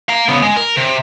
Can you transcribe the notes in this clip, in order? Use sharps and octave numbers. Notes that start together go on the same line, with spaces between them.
F5 A#5
C#3 B3
G#3
A#4
C3